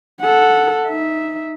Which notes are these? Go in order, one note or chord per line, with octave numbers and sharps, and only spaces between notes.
A4 F#5
D#4 E5